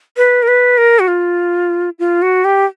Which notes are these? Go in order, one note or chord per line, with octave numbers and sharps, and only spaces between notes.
B4
A#4
B4
A#4
F#4
F4
F4
F#4
G4